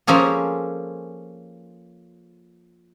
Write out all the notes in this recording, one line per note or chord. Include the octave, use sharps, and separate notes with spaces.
F3 A#3 C#4 G#4 A4